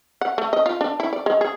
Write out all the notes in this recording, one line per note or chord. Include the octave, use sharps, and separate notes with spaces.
F#5
A3
D#5
F4
D4
E4
D5
G#3
G#4